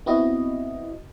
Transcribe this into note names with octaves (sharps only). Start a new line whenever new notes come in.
B3 C4 E4 F#4 D#5